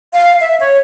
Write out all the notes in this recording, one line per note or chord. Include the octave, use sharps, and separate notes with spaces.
F5
E5
C#5